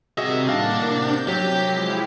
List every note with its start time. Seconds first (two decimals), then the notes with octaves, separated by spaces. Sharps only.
0.18 C3 D#3 G3 F#4 G#4 D#5 E5
0.49 A2 A#3 D4 F5 F#5 A#6
0.83 C3 A#4 G6
1.28 F#3 G4
1.64 F3 G#3 E4